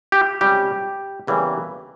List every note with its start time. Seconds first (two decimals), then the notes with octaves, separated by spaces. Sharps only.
0.12 G4
0.41 C#2 C3 G3 C#4 G4
1.27 E2 C#3 E3 G3 A#3